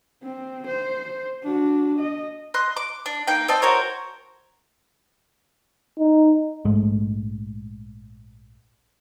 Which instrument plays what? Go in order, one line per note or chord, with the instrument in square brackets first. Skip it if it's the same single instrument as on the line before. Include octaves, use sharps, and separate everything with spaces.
[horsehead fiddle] C4
C5
D4 F#4
D#5
[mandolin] D#5 C6 F#6
D6
D4
A#3 D#4 G5
C4 D5 D#5 A5
F#4 A#4 C5 C#5
[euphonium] D#4
[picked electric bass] A#1 G#2 G#3 A3